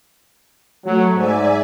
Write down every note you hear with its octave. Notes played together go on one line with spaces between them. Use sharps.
F#3 A3
G#2 D5 E5 G#5